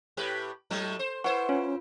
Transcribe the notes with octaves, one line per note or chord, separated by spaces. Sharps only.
A2 G4 B4
A2 F#3 A3
C5
E4 B4 C5 F#5 C#6
C#4 F4